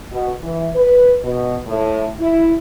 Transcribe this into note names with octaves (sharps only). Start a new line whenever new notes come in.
B2
E3
B4
B2
A2
E4